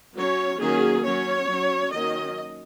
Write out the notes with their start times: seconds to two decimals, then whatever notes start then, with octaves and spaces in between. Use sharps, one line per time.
0.15 F#3 C#4 C#5
0.59 D#3 F#3 A#3 C#4 G#4
1.03 F#3 C#4 C#5
1.47 F#3 C#4
1.91 D#3 F#3 A#3 C#4 D#5